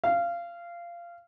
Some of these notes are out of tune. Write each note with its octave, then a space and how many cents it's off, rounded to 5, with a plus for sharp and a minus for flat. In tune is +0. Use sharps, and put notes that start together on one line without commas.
F5 -20